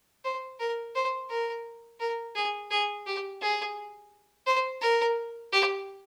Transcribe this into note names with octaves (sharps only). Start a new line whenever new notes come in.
C5
A#4
C5
A#4
A#4
G#4
G#4
G4
G#4
C5
A#4
G4